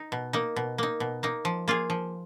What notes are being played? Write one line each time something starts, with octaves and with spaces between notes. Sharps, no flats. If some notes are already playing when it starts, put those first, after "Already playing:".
Already playing: D#4
B2
A#3 D#4
B2
A#3 D#4
B2
A#3 D#4
F3
A#3 F4 G#4
F3